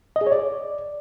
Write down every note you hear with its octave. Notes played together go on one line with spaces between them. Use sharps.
D#5
G#4
C#5
D5